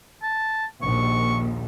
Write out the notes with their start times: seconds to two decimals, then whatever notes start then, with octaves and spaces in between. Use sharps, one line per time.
0.23 A5
0.82 A#1 D#2 C#6